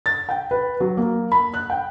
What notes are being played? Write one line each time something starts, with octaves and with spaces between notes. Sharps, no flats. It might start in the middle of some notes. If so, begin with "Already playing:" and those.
A6
G5
B4
F#3
A#3
B5
F#6
G5